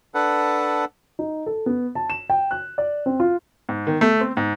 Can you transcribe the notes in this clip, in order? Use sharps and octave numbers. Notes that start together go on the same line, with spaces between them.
D4 A4 B4 F#5
D#4
A4
B3
A5
E7
G5
F#6
D5
C4
F4
G#2
D#3
A3
C4
G#2